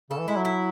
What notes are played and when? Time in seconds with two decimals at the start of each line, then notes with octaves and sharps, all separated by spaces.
0.10 C#3 A4
0.19 E3
0.28 G#3 E4
0.37 F#3
0.45 E4